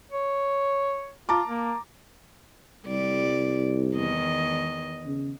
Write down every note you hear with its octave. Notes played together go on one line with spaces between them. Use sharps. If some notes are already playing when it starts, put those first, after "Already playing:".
C#5
F4 A5 A#5 D6
A#3
C2 G3 D5
E2 D#3 D#5
C#3